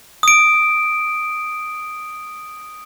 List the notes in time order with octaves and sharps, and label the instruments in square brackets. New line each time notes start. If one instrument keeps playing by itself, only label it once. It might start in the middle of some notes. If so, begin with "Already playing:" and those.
[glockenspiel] D#6 D7